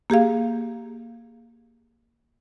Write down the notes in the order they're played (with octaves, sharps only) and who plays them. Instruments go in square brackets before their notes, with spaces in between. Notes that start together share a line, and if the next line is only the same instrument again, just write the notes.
[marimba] A#3 G4 G#4 F5